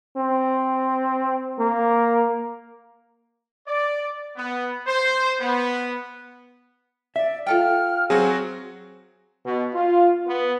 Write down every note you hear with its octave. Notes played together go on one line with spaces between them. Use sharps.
C4
A#3
D5
B3
C5
B3
D5 E5
F4 A4 G5 F6
F#3 C4 F#4 G#4
B2
F4
B3